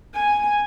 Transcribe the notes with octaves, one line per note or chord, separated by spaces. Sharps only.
G#5